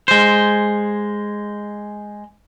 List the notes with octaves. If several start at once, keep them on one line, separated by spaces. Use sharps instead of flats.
G#3 C5